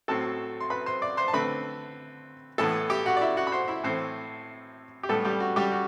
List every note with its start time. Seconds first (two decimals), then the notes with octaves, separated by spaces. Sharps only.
0.08 A2 F#3 C4 A4 A5
0.60 C6
0.70 B4 B5
0.86 C5 C6
1.02 D5 D6
1.17 C5 C6
1.28 A5
1.33 D3 A3 C4 B4 B5
2.58 A2 E3 B3 A4 A5
2.90 G4 G5
3.06 F#4 F#5
3.17 D5
3.21 E4 E5
3.37 F#4 F#5
3.47 B5
3.52 C5 C6
3.68 E4 E5
3.84 A2 E3 A3 C4 C5
5.03 G4
5.09 A2 G3 A3 B3 A4
5.25 G3 G4
5.40 F#4
5.56 G3 G4
5.72 F#4